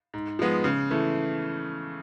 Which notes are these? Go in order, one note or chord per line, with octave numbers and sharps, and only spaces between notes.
G#2
F3 G#3 B3
C#3
E3 A3